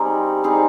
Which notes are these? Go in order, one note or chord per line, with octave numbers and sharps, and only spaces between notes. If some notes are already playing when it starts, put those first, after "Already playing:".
Already playing: G3 C4 D#4 G#4
G3 C4 D#4 G#4